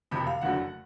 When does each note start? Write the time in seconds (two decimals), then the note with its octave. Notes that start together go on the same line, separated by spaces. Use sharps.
0.11 F#1 F2 C3 B5
0.26 F5
0.41 F#1 F2 D3 F#3 A3 F#5